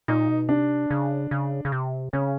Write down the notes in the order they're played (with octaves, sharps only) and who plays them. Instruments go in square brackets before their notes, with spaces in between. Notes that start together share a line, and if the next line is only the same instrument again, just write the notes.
[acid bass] A#2 [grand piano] D#4
[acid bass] B2
[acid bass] C3 [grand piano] D4
[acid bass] C#3
C#3
C#3
C3
[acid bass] C#3 [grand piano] C#4